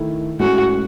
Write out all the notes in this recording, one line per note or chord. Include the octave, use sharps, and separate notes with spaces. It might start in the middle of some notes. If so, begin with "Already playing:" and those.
Already playing: D#3 A3 E4
A2 G#3 C#4 F#4